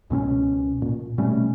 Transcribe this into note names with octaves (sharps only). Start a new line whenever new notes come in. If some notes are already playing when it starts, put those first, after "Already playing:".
C#2 B2 C4 C#4
A#2
B2 G3 A3 C#4